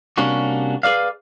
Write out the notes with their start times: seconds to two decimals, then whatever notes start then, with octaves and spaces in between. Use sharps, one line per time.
0.18 C3 G3 A#3 C#4 D4 F#4
0.83 G#4 B4 D5 F5